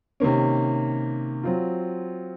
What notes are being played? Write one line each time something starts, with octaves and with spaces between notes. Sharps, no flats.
C3 D#3 A#3 C#4
F#3 C4 F4